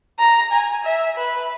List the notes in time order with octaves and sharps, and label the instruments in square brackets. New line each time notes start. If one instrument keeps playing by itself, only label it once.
[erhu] A#5
G#5
E5
B4